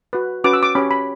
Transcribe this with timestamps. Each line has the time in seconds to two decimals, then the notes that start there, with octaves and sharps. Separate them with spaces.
0.13 F#4 B4
0.44 C#4 F#4 B4 D6
0.53 E6
0.63 D6
0.75 C#4 G4 C#5 B5
0.91 B5